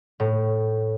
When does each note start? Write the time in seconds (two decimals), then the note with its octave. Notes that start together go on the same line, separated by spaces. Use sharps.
0.20 A2